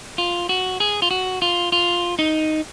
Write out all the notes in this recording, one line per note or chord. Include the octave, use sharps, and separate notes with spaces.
F4
F#4
G#4
F4
F#4
F4
F4
D#4